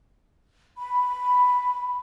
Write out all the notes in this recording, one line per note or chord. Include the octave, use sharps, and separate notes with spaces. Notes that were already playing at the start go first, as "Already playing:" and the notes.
B5